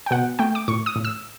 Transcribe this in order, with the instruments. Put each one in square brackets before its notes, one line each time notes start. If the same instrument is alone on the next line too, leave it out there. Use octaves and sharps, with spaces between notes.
[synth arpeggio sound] G5
B2 F#5
A3 G5
D6
A2 C#6
D#6
A2
E6